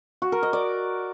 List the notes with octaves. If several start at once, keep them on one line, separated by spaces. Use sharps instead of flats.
F#4
A#4
D#5
D5